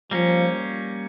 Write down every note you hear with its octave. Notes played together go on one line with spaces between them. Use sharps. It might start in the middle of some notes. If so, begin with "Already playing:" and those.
F3 G3 A#3 C#4